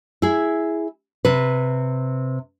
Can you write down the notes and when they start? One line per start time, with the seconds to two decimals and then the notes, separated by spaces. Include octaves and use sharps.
0.22 E4 G#4
1.25 C3 B4